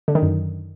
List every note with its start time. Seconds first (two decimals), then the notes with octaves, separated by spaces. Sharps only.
0.08 D3
0.15 D#3
0.22 F#2